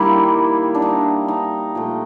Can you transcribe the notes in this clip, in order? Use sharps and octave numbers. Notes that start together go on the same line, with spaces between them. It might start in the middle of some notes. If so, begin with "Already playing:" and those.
Already playing: D#3 G3 A#3 E4
D4
D#4
D#4
A#2 F3 A3